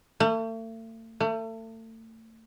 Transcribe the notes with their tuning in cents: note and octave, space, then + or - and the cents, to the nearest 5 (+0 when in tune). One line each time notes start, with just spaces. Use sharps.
A3 +40
A3 +35